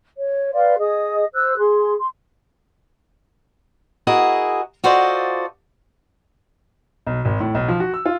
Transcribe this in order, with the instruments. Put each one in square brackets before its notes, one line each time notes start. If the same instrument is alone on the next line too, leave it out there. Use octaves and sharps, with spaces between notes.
[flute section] C#5
B4 D5 F5 C6
G#4 D#5 D#6
C5 E6 F#6
G#4 C6
C6
[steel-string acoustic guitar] E4 F#4 G#4 A#4 D#5
F4 F#4 A4 C5 D5 D#5
[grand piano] B1
G#1
A2
B1
F3
F#4
E6
F4